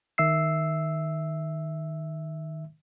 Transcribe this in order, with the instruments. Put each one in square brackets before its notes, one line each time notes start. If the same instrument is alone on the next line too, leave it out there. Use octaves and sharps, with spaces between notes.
[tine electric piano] D#3 E5 E6 C7